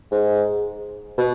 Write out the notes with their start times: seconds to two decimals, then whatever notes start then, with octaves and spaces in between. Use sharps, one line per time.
0.11 G#2
1.18 B2